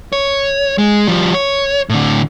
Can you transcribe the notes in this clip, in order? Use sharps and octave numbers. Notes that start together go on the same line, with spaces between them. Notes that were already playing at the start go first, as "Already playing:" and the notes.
C#5
G#3
F3 G3
C#5
A2 D3